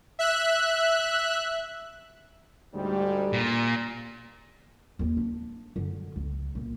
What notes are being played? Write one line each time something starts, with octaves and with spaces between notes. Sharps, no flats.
E5 F#6
D2 G#2 G3
A#2
D#2 E3
D4
F#2 D3
C#2
B1 A#2